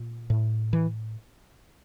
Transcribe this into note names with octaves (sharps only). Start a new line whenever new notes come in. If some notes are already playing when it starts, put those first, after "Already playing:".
Already playing: A#2
A2
E3